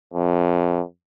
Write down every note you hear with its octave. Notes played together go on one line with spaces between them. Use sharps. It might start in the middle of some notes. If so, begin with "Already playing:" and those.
F2